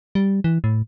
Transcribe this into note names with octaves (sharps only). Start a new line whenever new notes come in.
G3
E3
A2